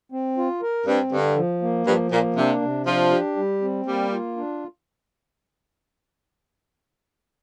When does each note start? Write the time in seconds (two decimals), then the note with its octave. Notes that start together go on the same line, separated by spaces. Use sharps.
0.12 C4
0.37 F4
0.62 A#4
0.87 G2 C4
1.11 G2 D3
1.36 F3
1.62 A#3
1.87 G2 F3
2.11 A#2 A#3
2.37 C3 D4
2.62 C3
2.86 F3 D4
3.12 G4
3.36 G3
3.61 C4
3.86 G3 A#3
4.12 F4
4.37 D4